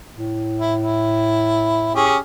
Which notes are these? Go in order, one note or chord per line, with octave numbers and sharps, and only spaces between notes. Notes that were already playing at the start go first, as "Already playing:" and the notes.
A2
E4
E4
C#4 G4 G#4